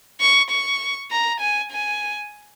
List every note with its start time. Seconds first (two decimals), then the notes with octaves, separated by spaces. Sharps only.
0.21 C#6
0.50 C#6
1.11 A#5
1.40 G#5
1.71 G#5